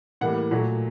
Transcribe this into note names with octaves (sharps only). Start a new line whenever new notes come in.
A2 E3 G3 A#3 F#5
A#2 F#3 A3